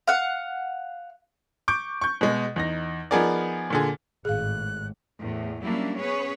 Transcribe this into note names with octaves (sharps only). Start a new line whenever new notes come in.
F5 F#5
C#6 D6 G6 D7
C#6 G6
B2 G#3
E2 D#4 A#6
F3 B3 D#4 G#4 A#4 D5
A#2 D3 G#4
G#1 A2 G#4 F5 F#6
E2 A2
F#3 G3 A#3 C#4 D4 E4
B3 C#4 G#4 B4 C#5